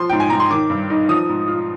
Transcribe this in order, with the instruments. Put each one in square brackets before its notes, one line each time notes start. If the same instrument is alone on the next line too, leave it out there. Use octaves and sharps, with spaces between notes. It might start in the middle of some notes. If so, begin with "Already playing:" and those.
Already playing: [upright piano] F3 C6
G#2 G5
G#5
G#2 A#5
C6
D#3 D6
G2
D#4
F3 D#6
G#2
F4